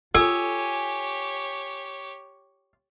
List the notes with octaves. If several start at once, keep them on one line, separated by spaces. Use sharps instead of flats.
F4 G4 A4 C#5 G#5 E6